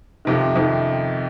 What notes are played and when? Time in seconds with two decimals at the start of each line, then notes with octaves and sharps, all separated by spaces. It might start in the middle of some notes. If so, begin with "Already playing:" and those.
0.25 F2 C3 D#3
0.55 F2 C3 D#3